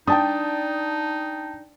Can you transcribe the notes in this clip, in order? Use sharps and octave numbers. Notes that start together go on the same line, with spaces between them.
D4 D#4 G5 A5 D#6